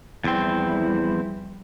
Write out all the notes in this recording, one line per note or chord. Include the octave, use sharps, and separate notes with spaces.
E2 F3 G3 C4 E4